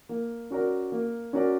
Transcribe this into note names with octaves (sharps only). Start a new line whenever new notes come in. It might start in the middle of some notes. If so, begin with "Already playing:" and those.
A#3
C#4 F#4 A#4 D5
A#3
C#4 F#4 A#4 D5